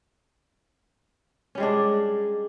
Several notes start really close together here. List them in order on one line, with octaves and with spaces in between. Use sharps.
C#4 G3 G#3 D4